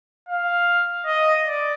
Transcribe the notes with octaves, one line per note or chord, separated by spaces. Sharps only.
F5
D#5
D5